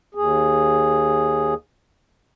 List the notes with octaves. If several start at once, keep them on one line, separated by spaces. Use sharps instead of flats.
D#2 G#4